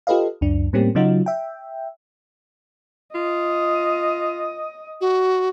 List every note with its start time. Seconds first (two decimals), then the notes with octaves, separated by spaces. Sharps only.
0.07 F4 G4 A4 B4 D#5 F5
0.41 C#2 F#2 D4
0.73 A2 G3 A#3 C4 C#4 G4
0.95 C#3 F#3 D#4 F4 F#4
1.26 E5 G5
3.14 F4 D#5
5.01 F#4